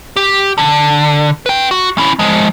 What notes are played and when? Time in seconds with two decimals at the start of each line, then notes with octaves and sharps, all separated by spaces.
0.16 G4
0.58 D3
1.46 B4 G5
1.71 F#4
1.98 C#4 E4
2.19 F3 G#3